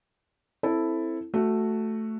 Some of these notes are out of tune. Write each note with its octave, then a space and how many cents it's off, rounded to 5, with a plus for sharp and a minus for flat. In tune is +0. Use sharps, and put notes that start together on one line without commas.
C4 +5 E4 +0 A4 +0
A3 +0 F#4 +0